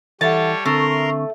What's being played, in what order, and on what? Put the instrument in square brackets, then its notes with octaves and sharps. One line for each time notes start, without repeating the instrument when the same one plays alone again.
[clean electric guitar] E3 [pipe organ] G3 C#5 [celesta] A4 E5 F#5 [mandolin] A5
[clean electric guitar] D3 C4 [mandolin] A3 [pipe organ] A#4 A#5 C6 [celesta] C#6